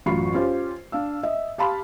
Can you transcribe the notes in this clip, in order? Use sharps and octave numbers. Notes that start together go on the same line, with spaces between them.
A1 F#2 F4 B5 C#6 C7
C#4 F4 G4 C5
D4 F5 E6
D#5 E5
G4 F5 A5 B5 C6 F6